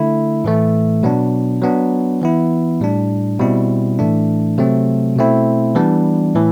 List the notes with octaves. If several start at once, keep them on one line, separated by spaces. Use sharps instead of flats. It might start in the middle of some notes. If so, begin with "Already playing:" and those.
Already playing: D3 A3 E4
A2 E3 A3
B2 F#3 B3 D4
F#3 B3 D4
E3 B3 E4
A2 G3 D4
B2 G3 C4 E4
A2 E3 A3 D4
C3 F#3 A3 C4
B2 A3 C4 E4
E3 G3 B3 D4
A2 E3